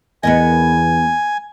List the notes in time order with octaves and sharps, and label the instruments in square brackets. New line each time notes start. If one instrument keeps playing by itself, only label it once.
[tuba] E2 [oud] B3 A#4 D#5 [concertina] G#5